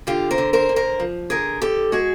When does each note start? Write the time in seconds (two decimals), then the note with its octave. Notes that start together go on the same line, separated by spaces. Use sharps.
0.07 D3 F4 G4
0.31 A#4 C5
0.38 D3
0.53 A#4 C5
0.69 D3
0.76 A#4 C5
1.00 F3
1.30 D3 G#4 A#4
1.62 D3 G4 A4
1.92 G#3 F#4 G#4